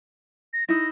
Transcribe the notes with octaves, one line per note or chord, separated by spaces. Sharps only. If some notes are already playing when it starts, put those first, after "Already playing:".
A#6
D#4 E4 A#6